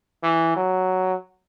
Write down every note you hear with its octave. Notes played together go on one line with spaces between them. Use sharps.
E3
F#3